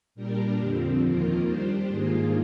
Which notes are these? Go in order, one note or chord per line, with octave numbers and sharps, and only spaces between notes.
A#2 G3 D4 G4 A#4
F2 D3 F3 C4
D#2 D#3 A#3 F4 A#4
G3 D4 G4 C5
G#2 D#3 A#3 F4 G#4